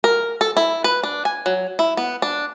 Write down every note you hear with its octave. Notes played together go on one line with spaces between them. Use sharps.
A#4
A4
E4
B4
D4
G#5
F#3
E4
B3
D4